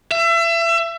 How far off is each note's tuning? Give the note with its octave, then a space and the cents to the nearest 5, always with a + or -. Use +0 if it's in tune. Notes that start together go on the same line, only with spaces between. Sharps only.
E5 +30